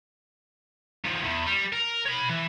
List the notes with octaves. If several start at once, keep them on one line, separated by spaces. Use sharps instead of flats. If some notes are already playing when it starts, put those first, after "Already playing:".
D#3 F3
E2
G3
A#4
C#5 B5
E3